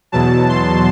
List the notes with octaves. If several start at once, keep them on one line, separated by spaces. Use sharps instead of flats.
E2 B2 F#3 A5
C6